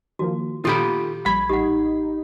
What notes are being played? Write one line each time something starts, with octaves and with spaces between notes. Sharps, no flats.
D#3 F3 A#3 F#4
A#2 D#3 F4 G4 A4 B5
A#1 G3 B5 G#6
A1 D#4 G4 F#5